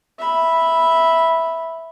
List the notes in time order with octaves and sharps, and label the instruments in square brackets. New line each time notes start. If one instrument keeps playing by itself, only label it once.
[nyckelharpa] E5 B5